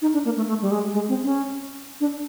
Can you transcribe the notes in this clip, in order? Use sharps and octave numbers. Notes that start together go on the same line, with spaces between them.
D#4
D4
A#3
A3
A3
G3
G#3
G#3
C4
C#4
D4